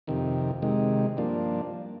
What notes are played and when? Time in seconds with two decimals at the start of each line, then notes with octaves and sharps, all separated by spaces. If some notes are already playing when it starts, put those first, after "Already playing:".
0.07 F2 C3 D#3
0.62 C3 D#3 G#3
1.17 G2 F3 A#3 D4